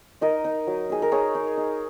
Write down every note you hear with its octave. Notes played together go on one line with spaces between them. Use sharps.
D#4 A#4 D#5
D#4
F#3
D#4 G#4
A#4
D#4 G#4 C#5
D#4
D#4